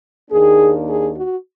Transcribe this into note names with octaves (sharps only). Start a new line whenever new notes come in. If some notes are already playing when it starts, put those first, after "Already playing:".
D#2 D#3 A#3 D4 G#4
G#4
F#4